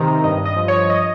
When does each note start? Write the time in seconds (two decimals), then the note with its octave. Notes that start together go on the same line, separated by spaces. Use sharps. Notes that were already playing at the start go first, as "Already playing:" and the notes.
Already playing: C3 D#3 A#5
0.24 G2 D#5
0.46 D#5
0.56 F3
0.68 C#5
0.90 D#5